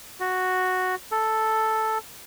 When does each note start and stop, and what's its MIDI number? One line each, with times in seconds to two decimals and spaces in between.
0.20 0.95 66
1.12 1.98 69